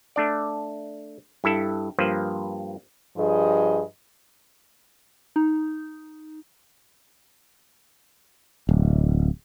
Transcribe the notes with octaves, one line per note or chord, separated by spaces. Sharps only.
A3 D4 D5
G2 E4 A4
G2 F3 A#3 B4 C5
G2 F3 G#4 D#5
D#4
D1